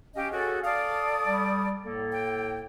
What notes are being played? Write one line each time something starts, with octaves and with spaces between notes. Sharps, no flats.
C#4 G4 D#5 F5
C#4 F#4 G#4 A4
A4 D5 F5 D#6
G3
A2 A#3 A4
G5